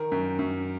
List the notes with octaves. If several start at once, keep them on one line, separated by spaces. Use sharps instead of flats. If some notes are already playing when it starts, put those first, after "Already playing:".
Already playing: D#3 A#4
F#2
F#2